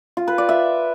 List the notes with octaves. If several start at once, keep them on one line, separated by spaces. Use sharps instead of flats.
F4
B4
D5
E5